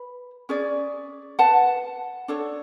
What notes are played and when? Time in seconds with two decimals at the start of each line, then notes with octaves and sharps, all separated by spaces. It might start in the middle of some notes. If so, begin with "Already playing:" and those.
Already playing: B4 B5
0.49 C#4 G#4 D5
1.39 B4 F#5 A5
2.28 D4 A4 C#5